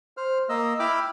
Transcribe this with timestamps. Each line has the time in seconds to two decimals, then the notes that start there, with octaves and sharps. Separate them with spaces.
0.17 C5 F6
0.49 A#3 D#5 E6
0.79 E4 G5 B5 D6 E6 F6